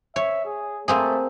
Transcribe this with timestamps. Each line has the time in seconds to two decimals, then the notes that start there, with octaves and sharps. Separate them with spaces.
0.16 C#5 E5
0.45 G#4
0.88 A3 A#3 C4 G#4